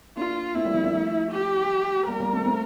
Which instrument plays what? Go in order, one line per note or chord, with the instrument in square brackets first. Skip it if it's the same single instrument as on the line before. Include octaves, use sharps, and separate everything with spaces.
[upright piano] A#3 D4 [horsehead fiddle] F4
[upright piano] A3 C4 [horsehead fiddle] E4
[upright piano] G3 A#3
F3 A3
A#3 D4
F3 A3
[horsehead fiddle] G4
[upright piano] G3 A#3 [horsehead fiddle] A#4
[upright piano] G3 A#3
A3 C4
A3 C4